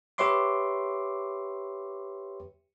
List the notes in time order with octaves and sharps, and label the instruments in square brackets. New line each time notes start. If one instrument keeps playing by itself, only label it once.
[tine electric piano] G4 B4 C#5 E5 C6 D6